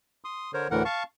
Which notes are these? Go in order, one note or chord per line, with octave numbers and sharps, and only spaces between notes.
C6 D#6
D3 A#4 C5 C#5
D2 A2 D3 E3 A#4 F#5
F5 A5 C#6